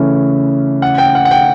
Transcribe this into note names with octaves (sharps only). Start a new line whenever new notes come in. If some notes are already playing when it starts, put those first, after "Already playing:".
Already playing: C#3 E3 A3 C#4
F#5
G5
F#5
F#5
G5